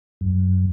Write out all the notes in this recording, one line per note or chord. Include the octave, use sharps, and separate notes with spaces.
F#2